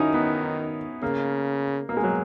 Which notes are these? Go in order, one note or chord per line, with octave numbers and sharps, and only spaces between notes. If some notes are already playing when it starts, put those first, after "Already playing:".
Already playing: D#3 C#4 D#4 E4 F#4
B3
C#3 A#3
B2 A#3
G#3
F#3